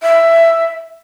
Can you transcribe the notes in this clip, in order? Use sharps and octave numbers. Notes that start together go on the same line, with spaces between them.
E5